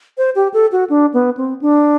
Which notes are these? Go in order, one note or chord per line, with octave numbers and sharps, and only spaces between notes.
C5
G4
A4
F#4
D4
B3
C4
D4